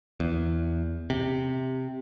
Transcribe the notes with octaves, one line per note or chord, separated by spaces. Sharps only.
E2
C3